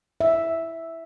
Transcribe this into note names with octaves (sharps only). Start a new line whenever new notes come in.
E5